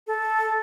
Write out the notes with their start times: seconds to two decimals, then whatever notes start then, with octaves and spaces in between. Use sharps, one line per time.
0.07 A4